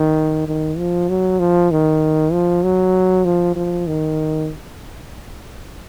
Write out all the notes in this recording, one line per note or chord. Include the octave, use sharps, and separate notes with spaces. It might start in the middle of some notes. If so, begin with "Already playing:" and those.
Already playing: D#3
D#3
F3
F#3
F3
D#3
F3
F#3
F3
F3
D#3